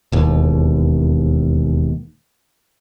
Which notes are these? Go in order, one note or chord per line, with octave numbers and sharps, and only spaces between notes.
E1 D#2